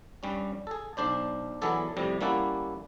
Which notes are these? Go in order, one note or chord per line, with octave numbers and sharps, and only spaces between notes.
G2 G3 C#4
G#4 A4
B1 D4 C5 D5
E3 F#3 B3 G#4 A4 D5
F2 A2 C3 G3
G3 A#3 C#4 E4 F#5 A5